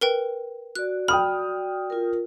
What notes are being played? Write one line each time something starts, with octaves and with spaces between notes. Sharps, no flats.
A#4 B4 G5
F#4 D5 F#6
G5 B5 D#6 F6
F4 A#4